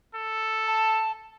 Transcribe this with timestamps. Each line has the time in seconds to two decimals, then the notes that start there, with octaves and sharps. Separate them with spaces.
0.15 A4
0.67 A5